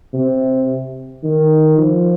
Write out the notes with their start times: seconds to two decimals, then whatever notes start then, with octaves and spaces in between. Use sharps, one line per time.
0.14 C3
1.24 D#3
1.78 F3